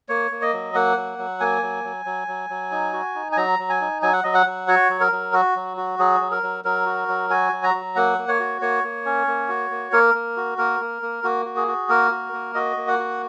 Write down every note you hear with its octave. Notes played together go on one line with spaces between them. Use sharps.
A#3 C#5
A#3
D#5
F#3
A#3 F#5
F#3
F#3
A#3 G#5
F#3
F#3
F#3
F#3
F#3
D#4
F#4
D#4
G#5
F#3 A#5
F#3
G#5
D#4
F#3 G#5
F#5
F#3 D#5
F#5
F#3
F#4 C#5
F#3
A#4
F#3
F#4
F#3
F#4
F#3 G#4
F#3
A#4
F#3
F#3 A#4
F#4
F#3
F#4 G#5
F#3
A#5
F#3
A#3 F#5
A#3
C#5
F#4
A#3 C#5
A#3
C#4
A#3
F#4
A#3
A#3 A#4
A#3
F#4
A#3 A#4
A#3
A#3
A#3 F#4
F#4
G#4
F#4
A#3 A#4
F#4
A#3
F#4 D#5
A#3
F#5
F#4